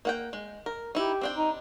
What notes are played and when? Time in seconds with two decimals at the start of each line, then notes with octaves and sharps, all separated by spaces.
0.05 A#3 F#5 G5
0.33 G#3
0.66 A#4
0.95 D#4 E4 G4
1.21 C4 D4 G5
1.37 D#4